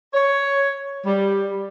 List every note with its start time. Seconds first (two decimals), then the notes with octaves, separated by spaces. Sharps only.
0.14 C#5
1.06 G3